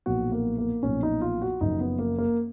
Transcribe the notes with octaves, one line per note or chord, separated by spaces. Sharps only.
B1 A#2 F3 F#4
A#3
A#3
B1 A#2 F3 C#4
D#4
F4
F#4
F#1 F#2 F3 D#4
B3
A#3
A#3